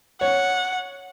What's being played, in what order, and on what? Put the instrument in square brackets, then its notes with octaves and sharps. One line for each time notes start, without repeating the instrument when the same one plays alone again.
[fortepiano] C#5 [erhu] F#5